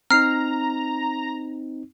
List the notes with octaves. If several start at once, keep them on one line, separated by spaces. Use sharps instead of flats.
C4 D#4 A#5 F6 C7